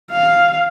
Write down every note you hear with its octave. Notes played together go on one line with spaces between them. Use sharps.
F5